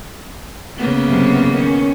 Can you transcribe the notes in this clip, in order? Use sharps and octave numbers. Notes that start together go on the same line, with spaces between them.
C#3 A#3 B3
F#2 C3
D#3 C#4